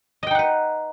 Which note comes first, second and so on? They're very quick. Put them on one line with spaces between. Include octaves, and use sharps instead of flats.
D#5 G5 D#4 F#5 B4